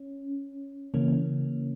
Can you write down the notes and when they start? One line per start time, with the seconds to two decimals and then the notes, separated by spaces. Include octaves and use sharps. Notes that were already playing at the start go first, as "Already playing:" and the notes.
Already playing: C#4
0.94 C#3 E3 A#3 C#4